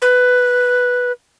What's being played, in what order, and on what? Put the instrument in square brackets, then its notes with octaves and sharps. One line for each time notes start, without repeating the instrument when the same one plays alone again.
[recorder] B4